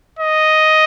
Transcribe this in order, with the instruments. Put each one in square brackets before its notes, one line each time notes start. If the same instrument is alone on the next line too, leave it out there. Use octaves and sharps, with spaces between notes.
[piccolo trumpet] D#5